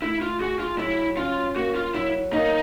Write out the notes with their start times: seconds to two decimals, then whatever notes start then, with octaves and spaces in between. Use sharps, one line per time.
0.02 A3 E4
0.21 F4
0.40 F#4 G#4
0.59 F4
0.78 F#3 E4
1.17 C#4 F4
1.56 A#3 F#4
1.75 F4
1.94 F#3 E4
2.33 A#3 D#4